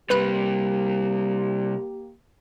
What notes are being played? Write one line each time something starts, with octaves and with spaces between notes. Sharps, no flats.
C3 G3 A#3 G4 B4 B5 F#6